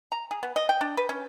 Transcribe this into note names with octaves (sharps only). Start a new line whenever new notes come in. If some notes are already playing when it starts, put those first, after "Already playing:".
A#5
G#4
B3
D#5
G5
D4
B4
C#4